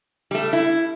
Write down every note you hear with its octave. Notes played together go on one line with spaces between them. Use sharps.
G3 A3
E4